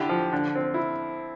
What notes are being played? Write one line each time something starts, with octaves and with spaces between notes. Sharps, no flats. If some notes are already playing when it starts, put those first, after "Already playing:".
Already playing: D3 E4 G4
F3
D3
C4
E4